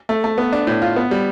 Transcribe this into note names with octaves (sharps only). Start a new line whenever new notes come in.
A3
A3
B3
D4
A2
F4
B3
G3